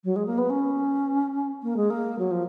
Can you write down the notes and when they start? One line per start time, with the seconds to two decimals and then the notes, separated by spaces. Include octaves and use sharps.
0.04 F#3
0.16 G#3
0.26 A#3
0.38 B3
0.50 C#4
1.63 A#3
1.76 G#3
1.90 A#3
2.19 F#3
2.31 F3